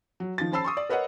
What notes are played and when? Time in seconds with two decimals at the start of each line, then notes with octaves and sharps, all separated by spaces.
0.20 F#3
0.38 D#3 F3 A6
0.52 C#4 C5 A5 B5 E6 C7
0.64 C6 C#6 D#6
0.77 D5
0.89 A#4 B4 C#5 D#5 F#5